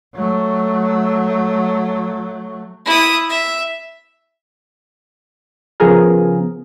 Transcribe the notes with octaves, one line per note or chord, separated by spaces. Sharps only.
F#3 A3
E4 D#6
E5
C#3 F3 B3 F4 G#4 A#4